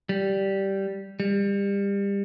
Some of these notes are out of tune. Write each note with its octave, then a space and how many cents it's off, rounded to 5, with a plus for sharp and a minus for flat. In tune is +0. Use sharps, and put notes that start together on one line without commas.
G3 -10
G3 +30